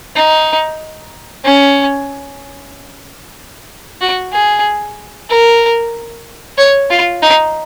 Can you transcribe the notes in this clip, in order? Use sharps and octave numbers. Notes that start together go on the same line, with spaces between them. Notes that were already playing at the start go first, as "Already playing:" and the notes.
D#4
C#4
F#4
G#4
A#4
C#5
F4
D#4